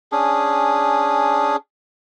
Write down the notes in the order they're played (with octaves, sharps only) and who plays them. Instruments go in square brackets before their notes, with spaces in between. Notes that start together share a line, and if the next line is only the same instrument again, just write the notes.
[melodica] C#4 D4 G#4